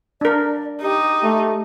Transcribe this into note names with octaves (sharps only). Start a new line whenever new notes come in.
D4 A#4 D5
D#4 G4
A3